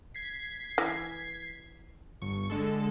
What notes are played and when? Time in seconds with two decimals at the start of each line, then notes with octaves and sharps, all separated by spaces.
0.15 G#6 B6 C7
0.78 E3
2.22 G1 C#6
2.50 D3 G#3 A4